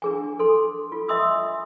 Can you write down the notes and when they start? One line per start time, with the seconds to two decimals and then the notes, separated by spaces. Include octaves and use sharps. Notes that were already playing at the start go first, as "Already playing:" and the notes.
0.02 D4 G#4 G#5
0.39 A4 C6
0.92 F4
1.08 D#5 E5 G#5 C6 D#6 E6